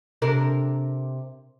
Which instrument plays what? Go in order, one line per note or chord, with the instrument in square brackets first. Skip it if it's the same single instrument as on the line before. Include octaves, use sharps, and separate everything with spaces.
[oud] C3 D4 A#4